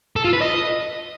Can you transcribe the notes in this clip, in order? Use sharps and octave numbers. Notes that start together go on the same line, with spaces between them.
A4
F4
B4
D#5